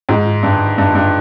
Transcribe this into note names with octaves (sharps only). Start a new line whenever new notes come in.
G#2
G2
G2
G2